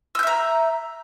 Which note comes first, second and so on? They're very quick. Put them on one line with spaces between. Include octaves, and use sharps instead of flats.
E6 G6 E5 A#5